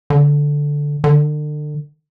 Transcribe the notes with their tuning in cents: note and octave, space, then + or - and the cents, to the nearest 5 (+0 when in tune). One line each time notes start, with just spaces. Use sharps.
D3 -5
D3 +35